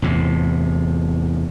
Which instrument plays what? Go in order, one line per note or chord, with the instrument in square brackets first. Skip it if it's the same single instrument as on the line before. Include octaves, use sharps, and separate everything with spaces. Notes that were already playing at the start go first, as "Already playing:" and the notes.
[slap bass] E2 A2 C3